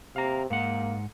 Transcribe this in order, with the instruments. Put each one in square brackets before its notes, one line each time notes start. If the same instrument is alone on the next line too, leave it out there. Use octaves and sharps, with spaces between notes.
[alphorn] C3 [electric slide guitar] F5 A#5
[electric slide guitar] G#2 F#5 [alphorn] A#3